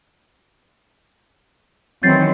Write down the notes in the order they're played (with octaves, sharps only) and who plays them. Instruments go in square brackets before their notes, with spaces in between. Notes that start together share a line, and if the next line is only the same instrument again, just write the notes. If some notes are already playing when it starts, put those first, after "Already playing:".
[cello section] D#3 E3 F#3 [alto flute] C4 [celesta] G6 A6 C7